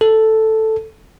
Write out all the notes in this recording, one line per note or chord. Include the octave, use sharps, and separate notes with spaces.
A4